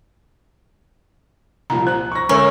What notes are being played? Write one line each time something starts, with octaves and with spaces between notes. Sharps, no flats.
C2 A#2 F3 A#5
C5 F#6
C#6 A#6
D3 G#3 C#4 A4 A#4 C#5 E6